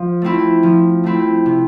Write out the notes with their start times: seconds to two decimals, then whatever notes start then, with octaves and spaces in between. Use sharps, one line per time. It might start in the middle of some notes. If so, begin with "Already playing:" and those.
Already playing: F3
0.22 A3 C4 E4
0.63 F3
1.04 A3 C4 E4
1.46 C3